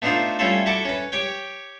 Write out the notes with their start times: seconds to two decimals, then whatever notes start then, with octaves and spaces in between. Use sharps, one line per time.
0.02 A3 B3 D4 D#4 F4 C5
0.39 G3 A3 C#4 E4 F4 A4
0.66 E4 F#4 A4 F#5 A5 D6
0.85 C#4 B4
1.12 G4 C#5 G5